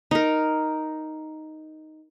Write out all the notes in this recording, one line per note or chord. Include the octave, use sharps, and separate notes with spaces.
D#4 A#4